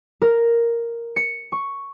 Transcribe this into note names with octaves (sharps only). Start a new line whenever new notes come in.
A#4
C#7
C#6